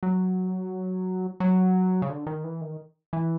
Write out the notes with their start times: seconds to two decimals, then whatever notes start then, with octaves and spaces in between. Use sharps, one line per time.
0.03 F#3
1.40 F#3
2.02 C#3
2.10 D3
2.26 D#3
2.44 E3
2.61 D#3
3.13 E3